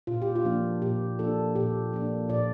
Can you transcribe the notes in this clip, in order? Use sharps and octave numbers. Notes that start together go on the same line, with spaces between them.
A#2 F4
G4
F4
F3 A#3 D4
A#2 G4
F3 A#3 D4 A4
A#2 G4
F3 A#3 D4
A#2 D5